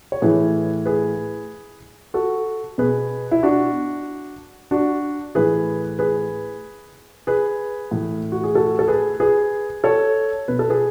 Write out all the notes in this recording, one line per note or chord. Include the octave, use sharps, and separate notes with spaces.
C#5
A2 E3 G#4 B4
G#4 B4
F#4 A4
B2 G#4 B4
E4
D4 F#4
D4 F#4
A2 E3 G#4 B4
G#4 B4
G#4 B4
A2 E3
F#4
G#4
F#4 A4
A4
G#4 B4
G#4 B4
A4 C#5
B2 B4
A4
G#4 B4